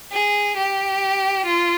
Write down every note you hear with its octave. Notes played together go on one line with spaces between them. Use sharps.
G#4
G4
F4